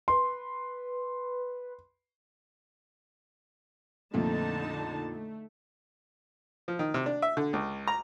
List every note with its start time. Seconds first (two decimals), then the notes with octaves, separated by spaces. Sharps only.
0.08 B4 C6
4.14 F2 A#2 D3 A3 D#4 A5
5.12 A3
6.68 F3
6.79 D#3
6.94 C3
7.06 D4
7.22 E5
7.37 D3
7.53 C#2
7.88 A#5